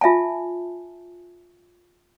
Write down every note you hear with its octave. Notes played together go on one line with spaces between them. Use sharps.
F4 E5 G#5 A5